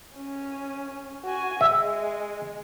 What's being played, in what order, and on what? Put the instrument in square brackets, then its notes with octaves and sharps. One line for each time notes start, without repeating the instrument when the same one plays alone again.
[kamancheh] C#4
F#4 G#5
[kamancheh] G#3 [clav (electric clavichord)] E5